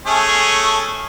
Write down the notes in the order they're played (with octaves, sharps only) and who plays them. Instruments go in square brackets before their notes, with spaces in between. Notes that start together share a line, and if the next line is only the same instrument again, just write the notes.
[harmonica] A3 C#4 G#4